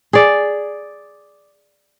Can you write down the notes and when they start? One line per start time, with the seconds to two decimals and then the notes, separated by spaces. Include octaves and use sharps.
0.13 G#4 D5